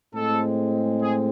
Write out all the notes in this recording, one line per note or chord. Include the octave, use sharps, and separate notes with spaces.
A2 G#3 C4 A4
G#4